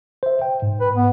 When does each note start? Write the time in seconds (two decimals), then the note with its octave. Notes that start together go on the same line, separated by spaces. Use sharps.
0.23 C5 E5
0.42 G5
0.62 G#2
0.81 B4
0.95 B3